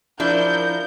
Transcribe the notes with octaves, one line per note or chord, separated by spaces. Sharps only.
F3 D4 E4 A#4 G6